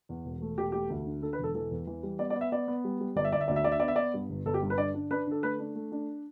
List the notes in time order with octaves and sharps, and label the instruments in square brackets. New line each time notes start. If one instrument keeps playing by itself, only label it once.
[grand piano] E2
E1
A3
E1 G4
A3 G4
D2
D3
D3 A4
B4
E1 A4
E3 A4
E2
E3
G3
B3 D5
D5
B3
E5
B3 D5
B3
G3
G3
G1 D5
E5
G1 D5
E5
D2 D5
E5
D3 D5
E5
B3 D5
E5
B3 D5
G2
G1
G1 A4
G4
G2
B4
D3 D5
D4
D4 B4
D3 A4
A3 B4
D4
A3
D4